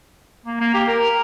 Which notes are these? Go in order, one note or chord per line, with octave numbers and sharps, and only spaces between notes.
A#3
A#3
G4
A#4